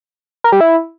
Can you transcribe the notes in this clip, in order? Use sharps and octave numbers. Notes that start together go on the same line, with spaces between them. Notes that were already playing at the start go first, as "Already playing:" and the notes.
A#4
G3
E4